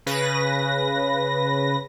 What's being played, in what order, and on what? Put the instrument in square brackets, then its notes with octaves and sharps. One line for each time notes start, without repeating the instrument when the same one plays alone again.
[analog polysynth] C#3 B4 A#6